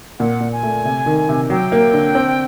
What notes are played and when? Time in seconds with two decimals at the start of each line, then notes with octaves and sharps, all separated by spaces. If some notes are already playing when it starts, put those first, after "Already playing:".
0.19 A#2 F#5
0.40 A#2
0.52 G#5
0.63 A3
0.85 C3
1.06 D#3
1.29 C3
1.50 F#3 G5
1.72 A#3
1.93 D3
2.15 C4